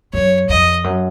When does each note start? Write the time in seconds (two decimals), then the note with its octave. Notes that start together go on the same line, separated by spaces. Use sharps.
0.13 F#2 C#5
0.49 F2 D#5
0.84 F#2